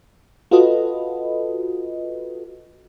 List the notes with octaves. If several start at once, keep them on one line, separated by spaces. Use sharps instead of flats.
F4 F#4 A4 B4 D#5